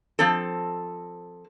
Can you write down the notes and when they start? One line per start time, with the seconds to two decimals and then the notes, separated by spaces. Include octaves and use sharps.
0.19 F3 C4 A4